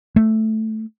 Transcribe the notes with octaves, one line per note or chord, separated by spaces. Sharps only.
A3